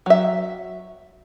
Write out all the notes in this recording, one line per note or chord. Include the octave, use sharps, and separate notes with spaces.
F#3 E5